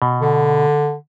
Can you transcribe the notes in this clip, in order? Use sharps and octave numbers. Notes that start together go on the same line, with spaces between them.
B2
D3